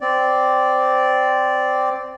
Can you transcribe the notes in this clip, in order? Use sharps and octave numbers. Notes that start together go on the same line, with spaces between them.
C4 D5